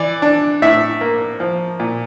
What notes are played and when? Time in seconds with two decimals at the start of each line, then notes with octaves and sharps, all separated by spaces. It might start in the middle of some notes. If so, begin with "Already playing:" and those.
Already playing: E3 D5
0.22 D4
0.62 A2 E5
1.01 A#3
1.40 F3
1.80 A#2